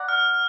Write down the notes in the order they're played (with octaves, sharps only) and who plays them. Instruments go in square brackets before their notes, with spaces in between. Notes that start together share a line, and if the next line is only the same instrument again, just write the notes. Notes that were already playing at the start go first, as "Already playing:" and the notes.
Already playing: [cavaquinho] D5 F#5 A#5
[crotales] F6